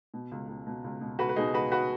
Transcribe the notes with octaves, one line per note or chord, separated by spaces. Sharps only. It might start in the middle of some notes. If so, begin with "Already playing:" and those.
B2
C#2
C#2
B2
C#2
B2
C#2 F#4 B4
B4
B2 D#4 G#4
C#2 F#4 B4
F#4 B4